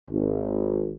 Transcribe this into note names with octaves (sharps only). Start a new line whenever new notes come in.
G#1